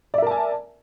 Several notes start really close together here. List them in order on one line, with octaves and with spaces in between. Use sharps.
D5 E5 A#4 A5 G#5